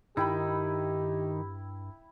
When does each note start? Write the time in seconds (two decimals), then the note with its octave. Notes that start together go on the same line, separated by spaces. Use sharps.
0.17 G2 D#3 D#4 E4 G4 G5 B5